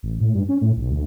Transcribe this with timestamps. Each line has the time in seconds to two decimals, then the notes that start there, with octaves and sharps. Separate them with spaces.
0.03 A1
0.21 A2
0.34 G2
0.49 C#4
0.61 A2
0.77 B1
0.90 D2